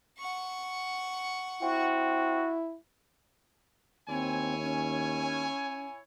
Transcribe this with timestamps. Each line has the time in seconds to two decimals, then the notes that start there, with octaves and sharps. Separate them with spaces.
0.18 F#5 C#6
1.62 C4 E4 F#4
4.09 D#2 C4 E4 C#5 G#5
4.62 C#4